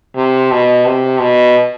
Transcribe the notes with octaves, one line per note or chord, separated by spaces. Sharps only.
C3
B2
C3
B2